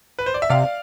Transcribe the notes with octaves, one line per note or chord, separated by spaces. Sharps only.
B4
C5
D5
E5
C3 D5 F5